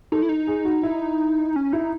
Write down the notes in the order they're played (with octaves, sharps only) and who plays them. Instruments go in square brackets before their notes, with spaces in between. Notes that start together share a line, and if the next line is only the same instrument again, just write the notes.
[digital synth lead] D#4 [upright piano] A4
[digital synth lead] E4
D#4
[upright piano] G#4
F#4
E4
[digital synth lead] C#4
[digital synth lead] D#4 [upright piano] E4